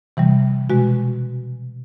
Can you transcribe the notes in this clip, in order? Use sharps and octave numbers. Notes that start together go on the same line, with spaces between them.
C3 E3 G3
B2 G#3 F#4